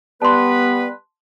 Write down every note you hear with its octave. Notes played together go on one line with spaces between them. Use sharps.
G3 B3 B4 A5 C6